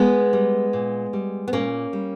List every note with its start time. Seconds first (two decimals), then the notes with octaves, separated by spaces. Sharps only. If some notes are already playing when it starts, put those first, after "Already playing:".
Already playing: G#3 B3
0.33 G3
0.73 A#2
1.13 G3
1.48 B3
1.53 A#2 A#3 C#4
1.93 G3